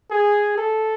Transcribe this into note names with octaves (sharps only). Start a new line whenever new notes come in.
G#4
A4